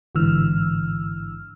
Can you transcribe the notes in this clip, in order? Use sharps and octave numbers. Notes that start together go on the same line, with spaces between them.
A1 G#2 D3 E3 E6 F6